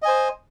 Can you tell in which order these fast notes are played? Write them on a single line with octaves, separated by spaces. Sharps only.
D#5 G#5 C5